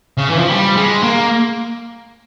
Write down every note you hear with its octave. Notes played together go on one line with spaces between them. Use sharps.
C#3
E3
F3
G3
G#3
A#3